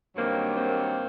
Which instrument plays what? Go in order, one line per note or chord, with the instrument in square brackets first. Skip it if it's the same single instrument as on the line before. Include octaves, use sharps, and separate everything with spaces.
[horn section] G2 D#3 F#3 A#3 C4
A#3 C4